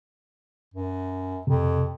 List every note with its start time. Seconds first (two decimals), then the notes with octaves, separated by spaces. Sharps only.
0.74 F#2
1.47 F2 C3